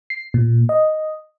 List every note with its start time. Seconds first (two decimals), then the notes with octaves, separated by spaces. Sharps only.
0.10 C7
0.34 A#2
0.69 D#5